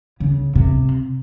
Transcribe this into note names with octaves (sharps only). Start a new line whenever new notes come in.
C#3
C3